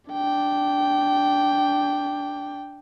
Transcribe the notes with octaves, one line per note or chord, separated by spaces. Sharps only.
D4 G5